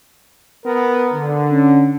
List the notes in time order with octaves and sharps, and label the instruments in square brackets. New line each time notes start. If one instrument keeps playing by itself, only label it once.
[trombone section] B3 A#4
D3
[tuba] C#4